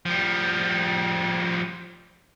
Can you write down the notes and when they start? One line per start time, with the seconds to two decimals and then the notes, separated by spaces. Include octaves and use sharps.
0.06 F3 G3